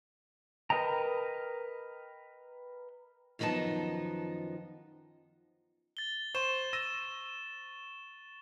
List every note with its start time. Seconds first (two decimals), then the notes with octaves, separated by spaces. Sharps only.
0.70 A#4 B4 D#5 G5 A#5
3.39 F#2 D#3 F3 B3 D#4 A5
5.97 A6 G7
6.35 C5 C6 C#6 E7
6.73 E6 A#6 D#7